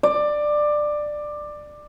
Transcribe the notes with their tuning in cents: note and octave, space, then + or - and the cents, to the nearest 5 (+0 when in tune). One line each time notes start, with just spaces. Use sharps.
D5 +15